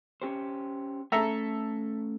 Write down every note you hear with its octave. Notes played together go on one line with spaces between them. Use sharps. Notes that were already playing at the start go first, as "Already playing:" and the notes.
C#4 G4 C5
A3 C#4 A4 E5 A#5